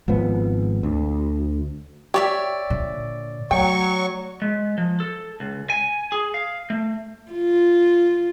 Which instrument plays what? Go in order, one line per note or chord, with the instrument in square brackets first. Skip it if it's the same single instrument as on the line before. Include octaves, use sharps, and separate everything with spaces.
[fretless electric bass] G#1 G#2 F3 B3
D2
[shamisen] G4 [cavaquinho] C#5 D5 E5
[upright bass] A#2 D3
[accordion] F#3 C#6 [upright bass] A3 [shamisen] G5
[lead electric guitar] G#3
F3
A4
C#2
G#5
G#4
F5
A3
[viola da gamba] F4